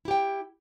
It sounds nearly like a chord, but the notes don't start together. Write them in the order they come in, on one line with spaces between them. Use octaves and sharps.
E4 G4 G5